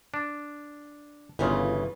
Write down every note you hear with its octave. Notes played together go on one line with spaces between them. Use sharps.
D4
G1 C#3 E3 C#4 F4